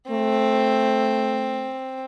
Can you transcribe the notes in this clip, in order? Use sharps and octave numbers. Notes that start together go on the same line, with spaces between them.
A3 C4